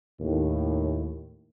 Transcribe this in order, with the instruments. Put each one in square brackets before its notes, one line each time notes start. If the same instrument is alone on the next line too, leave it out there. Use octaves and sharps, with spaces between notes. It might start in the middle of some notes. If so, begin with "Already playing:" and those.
[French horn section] D#2 A2